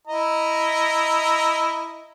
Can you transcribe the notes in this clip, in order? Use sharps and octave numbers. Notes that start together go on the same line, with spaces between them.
E4 D#5 A#5